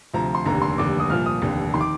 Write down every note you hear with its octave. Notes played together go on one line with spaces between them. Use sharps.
D2 C3 F3 A#5
C6
F1 D#2 D3 A#5
C6
F1 D#2 D3 D6
D#6
C2 A#2 F3 F6
D#6
F1 D#2 D3
D#3 C6
D6